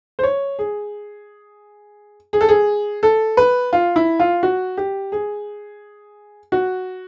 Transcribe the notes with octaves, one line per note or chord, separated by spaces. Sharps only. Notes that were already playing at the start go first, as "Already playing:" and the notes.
C5
C#5
G#4
G#4
A4
G#4
A4
B4
F4
E4
F4
F#4
G4
G#4
F#4